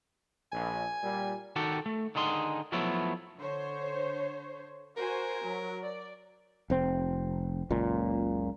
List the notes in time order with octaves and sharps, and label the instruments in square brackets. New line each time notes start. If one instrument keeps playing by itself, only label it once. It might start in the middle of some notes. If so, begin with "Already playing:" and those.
[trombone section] A#1 [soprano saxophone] G#5
[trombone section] A#2 G3
[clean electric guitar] D#3 F#4 G4 A4
A3
D3 D#3 D#4 G#4 C6
F3 F#3 A3 B3 E4
[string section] D3 C5 C#5
[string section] F#4 C5 G#5 [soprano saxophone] A#4
[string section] F#3
D5
[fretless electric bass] F1 C4
F#1 C#2 A#2